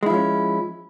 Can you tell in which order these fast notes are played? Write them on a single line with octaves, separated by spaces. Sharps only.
G#3 E4 F3 C#4